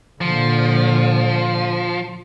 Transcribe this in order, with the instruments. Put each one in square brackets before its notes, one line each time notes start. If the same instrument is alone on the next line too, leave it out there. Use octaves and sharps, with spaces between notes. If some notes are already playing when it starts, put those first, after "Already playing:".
[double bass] A#2 D3 [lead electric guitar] F3